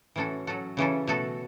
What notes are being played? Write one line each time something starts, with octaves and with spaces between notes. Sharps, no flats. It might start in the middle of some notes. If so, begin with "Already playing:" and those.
A2 E3 C#4 F#4 A4
F#3 C#4 F#4 A4
C#3 E3 C#4 A4
B2 A3 F#4 A4